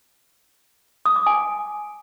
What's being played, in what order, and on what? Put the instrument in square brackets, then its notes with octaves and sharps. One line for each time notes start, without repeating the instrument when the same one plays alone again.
[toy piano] D#6
D6
G#5